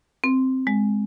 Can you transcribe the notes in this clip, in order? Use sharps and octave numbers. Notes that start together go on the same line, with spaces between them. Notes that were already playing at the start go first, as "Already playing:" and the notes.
C4
G#3